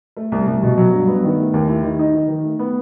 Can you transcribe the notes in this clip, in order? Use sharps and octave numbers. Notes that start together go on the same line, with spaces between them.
A3
C2
C2
B2
F#3
G2
B3
D#3
A3
D#2
E4
D#3
D#4
D#3
D#3
A3
B3